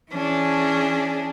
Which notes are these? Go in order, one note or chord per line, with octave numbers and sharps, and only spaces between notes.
E3 C#4 D4 G#4